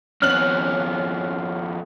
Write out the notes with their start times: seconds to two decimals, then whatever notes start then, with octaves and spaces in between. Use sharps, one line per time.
0.22 F2 B3 C#4 F6 F#6 F#7